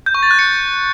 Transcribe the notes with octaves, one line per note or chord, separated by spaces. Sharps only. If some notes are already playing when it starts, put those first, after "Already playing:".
G6
C#6
A6
F#6
C#7